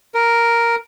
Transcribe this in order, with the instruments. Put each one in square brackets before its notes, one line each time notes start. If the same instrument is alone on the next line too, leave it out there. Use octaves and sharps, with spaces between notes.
[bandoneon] A#4